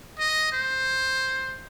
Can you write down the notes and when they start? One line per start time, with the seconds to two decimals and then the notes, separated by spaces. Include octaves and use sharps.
0.19 D#5
0.52 C5